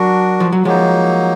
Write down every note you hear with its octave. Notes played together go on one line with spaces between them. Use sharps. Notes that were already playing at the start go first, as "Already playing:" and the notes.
Already playing: F#3 D4 F#4 A#4
F3
F#3
F3 F#3 G#3 A#3 D#4